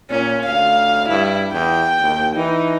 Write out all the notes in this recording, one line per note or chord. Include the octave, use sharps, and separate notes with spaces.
A#2 C#4
D2 F5
G2 E4
E2 G5
D#2
E3 D#4